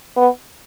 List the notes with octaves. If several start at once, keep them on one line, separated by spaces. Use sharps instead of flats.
B3